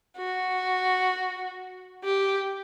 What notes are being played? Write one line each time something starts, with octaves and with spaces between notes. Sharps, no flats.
F#4
G4